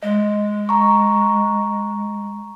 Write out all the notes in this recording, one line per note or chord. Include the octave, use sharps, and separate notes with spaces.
G#3 D#5
A#5 C#6